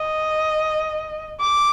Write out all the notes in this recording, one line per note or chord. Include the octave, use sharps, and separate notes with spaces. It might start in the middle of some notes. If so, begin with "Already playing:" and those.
Already playing: D#5
D6